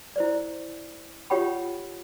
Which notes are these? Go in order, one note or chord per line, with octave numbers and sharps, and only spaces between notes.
E4 C5 D5
F4 G4 C#5 F#5 G5 B5